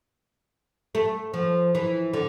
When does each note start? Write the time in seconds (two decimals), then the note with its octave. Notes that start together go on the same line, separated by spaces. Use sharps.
0.95 A3
1.34 F3
1.75 E3
2.13 D3